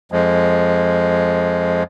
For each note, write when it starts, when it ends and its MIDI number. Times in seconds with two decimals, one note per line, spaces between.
0.12 1.83 41
0.12 1.83 53
0.12 1.83 56